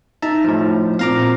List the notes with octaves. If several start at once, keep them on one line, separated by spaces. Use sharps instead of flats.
D#4 E5 A5 A#5
A2 F3
A#2 C4 F5 A#5 D6